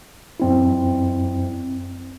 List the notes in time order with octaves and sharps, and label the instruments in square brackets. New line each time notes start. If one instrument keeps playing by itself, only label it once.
[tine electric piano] F#2 C4 E4